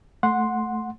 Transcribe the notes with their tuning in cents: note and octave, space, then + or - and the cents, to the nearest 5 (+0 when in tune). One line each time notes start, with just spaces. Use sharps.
A3 +0 F#5 -15 C6 +0